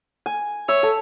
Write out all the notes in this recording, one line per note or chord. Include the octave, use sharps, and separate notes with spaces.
G#5
C#5 E5
A4